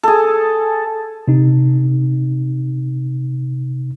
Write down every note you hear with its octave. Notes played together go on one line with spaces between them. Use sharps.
G#4 A4
C3 D#4